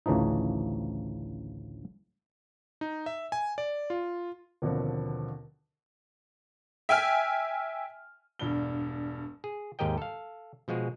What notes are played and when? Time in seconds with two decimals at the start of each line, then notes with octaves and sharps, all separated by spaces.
0.06 A1 D2 C#3 E3 F3 D#4
2.81 D#4
3.06 E5
3.32 G#5
3.58 D5
3.90 F4
4.62 D#2 B2 D3 F3 B3 C4
6.89 E5 G5 G#5 F6
8.39 E1 G2 G7
9.44 G#4
9.79 D#2 G#2 G4 A#4 D#5 G5
9.98 A4 F5
10.68 B2 F3 G#3 F#4 G#4